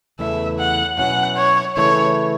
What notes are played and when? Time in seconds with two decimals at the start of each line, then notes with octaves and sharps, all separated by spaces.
0.19 E2 C#3 E3 A3 E4 E5
0.59 F#5
0.98 B2 F#3 C#4 E4 F#5
1.38 C#5
1.77 C#3 E3 A3 E4 C#5